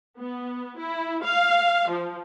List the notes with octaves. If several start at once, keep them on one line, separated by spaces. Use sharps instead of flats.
B3
E4
F5
F3